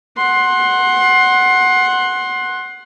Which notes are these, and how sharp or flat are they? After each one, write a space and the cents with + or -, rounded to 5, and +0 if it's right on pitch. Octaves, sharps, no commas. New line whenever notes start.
F#5 +0 C6 +20